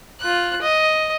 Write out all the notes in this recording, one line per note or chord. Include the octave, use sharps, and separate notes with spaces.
F4 F#6
D#5